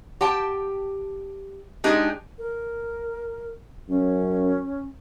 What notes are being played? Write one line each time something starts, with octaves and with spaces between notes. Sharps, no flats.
G4 G5 A5
G#3 D4 D#4 G4 G#4
A#4
F#2 C#4